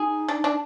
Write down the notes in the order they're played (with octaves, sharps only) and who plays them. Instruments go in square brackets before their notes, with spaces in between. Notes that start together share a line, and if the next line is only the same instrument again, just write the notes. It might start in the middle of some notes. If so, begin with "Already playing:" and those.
Already playing: [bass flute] D#4 [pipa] G#4
[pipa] D4
D4